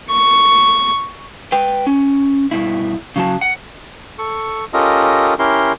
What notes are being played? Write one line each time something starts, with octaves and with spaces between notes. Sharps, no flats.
C#6
B4 G5
C#4
G2 B2 E4
C#3 F#3 A5
F#5
A4 C#6
C#4 F4 G4 A4 A#4 D#5
C#4 E4 G4 A#4 C6